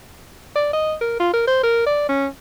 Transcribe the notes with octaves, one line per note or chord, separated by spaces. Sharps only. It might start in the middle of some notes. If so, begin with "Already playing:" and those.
D5
D#5
A#4
F4
A#4
C5
A#4
D5
C#4